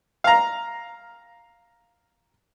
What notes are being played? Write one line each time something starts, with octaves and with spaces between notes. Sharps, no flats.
F5 A#5